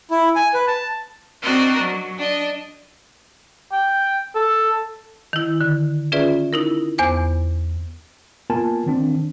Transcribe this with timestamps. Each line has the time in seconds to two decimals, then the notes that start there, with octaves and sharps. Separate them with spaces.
0.11 E4
0.36 G#5
0.54 B4
0.67 A5
1.41 C4 D4 F#4 A#4 D#5
1.80 F#3
2.17 D4 D#5
3.72 G5
4.35 A4
5.33 D#3 E4
5.61 D3
6.12 C#4 F4 G#4 B4 D5 E5
6.53 D#4 E4 A#4
6.98 E2 B3 C5 G#5 D6
8.50 A#3 B3 F4 A#4 G#5 A5
8.87 D#3 C4 D4